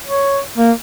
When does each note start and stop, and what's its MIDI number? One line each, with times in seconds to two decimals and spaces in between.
0.06 0.40 73
0.57 0.71 58